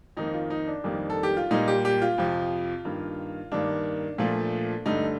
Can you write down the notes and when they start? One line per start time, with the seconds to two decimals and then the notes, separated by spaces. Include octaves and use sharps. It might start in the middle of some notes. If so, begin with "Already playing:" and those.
0.17 F2 D#3 A#3 D#4
0.33 F4
0.50 D#4
0.67 D4
0.84 F2 D#3 G3 A#3
1.10 A4
1.23 G4
1.37 F4
1.51 A#2 G3 A#3 D#4
1.68 G4
1.85 G4
2.02 F4
2.18 F2 C3 F3
2.85 G2 D#3 A#3
3.52 G2 D#3 A#3 D4
4.18 A#2 F3 A3
4.86 G2 D3 A3 D#4